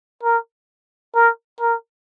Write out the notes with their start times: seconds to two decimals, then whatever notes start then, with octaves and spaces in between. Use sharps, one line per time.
0.24 A#4
1.15 A#4
1.61 A#4